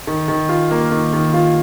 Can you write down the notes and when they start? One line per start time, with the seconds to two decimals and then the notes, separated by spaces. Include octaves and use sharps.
0.07 D#3
0.28 D#3
0.49 F4
0.71 A#3
0.91 D#3
1.13 D#3
1.34 F4